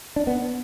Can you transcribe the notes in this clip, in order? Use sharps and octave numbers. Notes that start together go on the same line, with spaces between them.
D4
B3